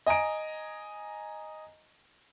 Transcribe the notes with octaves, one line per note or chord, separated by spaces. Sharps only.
D#5 G#5 A#5 D7